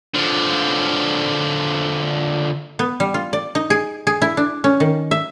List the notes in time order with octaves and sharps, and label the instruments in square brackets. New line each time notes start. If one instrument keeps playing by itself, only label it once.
[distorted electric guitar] D3 F3
[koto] B3
G3
F4
D5
D#4
G#4
G#4
E4
D4
C#4
D#3
E5